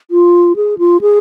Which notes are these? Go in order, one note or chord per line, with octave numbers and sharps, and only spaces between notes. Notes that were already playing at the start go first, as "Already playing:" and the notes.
F4
G#4
F4
G#4